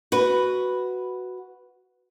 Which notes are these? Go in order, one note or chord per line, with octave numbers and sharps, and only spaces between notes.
F#4 B4